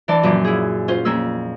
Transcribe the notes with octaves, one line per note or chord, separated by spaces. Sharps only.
E3 D4 D5 A5
F#2 A#2 F3 C#4 D6
E4 G#4
C#4 F4 C5
F2 A#3 C#4 E6